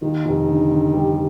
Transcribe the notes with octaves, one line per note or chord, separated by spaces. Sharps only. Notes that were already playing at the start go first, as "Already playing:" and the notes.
D#2 D#3
F1
D3
D3
G3